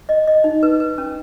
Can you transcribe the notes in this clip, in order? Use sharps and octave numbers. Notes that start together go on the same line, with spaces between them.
D#5
D#5
D#4
B4
B4
C#4